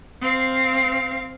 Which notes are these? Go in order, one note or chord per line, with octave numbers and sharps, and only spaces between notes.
C4 F5